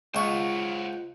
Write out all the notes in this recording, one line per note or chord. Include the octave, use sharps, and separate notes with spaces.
C#2 F4 C5 C#5 F#5 C#6